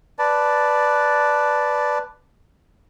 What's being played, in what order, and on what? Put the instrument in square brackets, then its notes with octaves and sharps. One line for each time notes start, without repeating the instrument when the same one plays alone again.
[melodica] B4 D5 A5